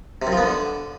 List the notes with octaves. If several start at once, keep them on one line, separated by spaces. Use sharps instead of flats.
C3
F#2
F3
B3
D3